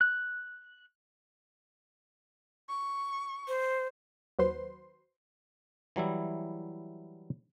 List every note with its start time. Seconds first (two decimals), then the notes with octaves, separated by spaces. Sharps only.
0.01 F#6
2.69 C#6
3.48 C5
4.39 D#2 F#3 B4 C5 C6
5.96 E3 F#3 G3 E4